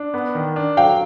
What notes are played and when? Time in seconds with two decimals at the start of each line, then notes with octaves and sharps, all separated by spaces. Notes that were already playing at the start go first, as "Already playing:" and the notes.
Already playing: D4
0.14 B3
0.35 D#3
0.56 D4
0.77 F#3 F5 G5